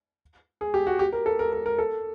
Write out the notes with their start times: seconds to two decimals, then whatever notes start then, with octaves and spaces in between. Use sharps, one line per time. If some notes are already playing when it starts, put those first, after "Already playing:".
0.61 G#4
0.74 G4
0.87 F#4
0.99 G4
1.13 A#4
1.26 A4
1.39 A#4
1.53 A#4
1.66 A#4
1.79 A4